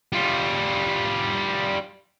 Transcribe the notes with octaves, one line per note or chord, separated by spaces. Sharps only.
G3 F4